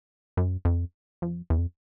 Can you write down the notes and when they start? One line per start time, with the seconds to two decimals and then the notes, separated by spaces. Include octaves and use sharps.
0.37 F#2
0.65 F2
1.22 F2
1.50 E2
1.58 F2